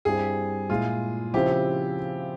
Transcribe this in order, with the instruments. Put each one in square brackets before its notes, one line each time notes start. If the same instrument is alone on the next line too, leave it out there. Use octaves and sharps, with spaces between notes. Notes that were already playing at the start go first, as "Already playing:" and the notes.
[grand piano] G2 G3 C4 E4 [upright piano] G#4
[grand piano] A#2 G#3 E4 [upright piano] F4
[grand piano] C#3 F3 C4 E4 [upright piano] G4